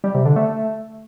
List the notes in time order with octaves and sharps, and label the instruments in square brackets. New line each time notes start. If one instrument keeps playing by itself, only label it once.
[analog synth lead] G3
C3
D3
A3